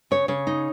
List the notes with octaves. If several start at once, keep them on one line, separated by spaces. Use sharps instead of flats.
C#3 C#5
C#3 C#5
D#4